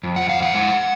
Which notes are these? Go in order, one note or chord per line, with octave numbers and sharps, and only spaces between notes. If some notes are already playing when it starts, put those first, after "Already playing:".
F2
F#5
F2
F5
F2 F#5
G#3